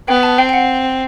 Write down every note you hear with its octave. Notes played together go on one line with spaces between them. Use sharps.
B3 G5
A5
C4 G5
G5
F#5